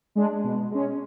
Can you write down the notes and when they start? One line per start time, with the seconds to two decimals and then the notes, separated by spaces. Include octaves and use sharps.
0.15 G#3 D4
0.44 B2
0.71 G#3 C#4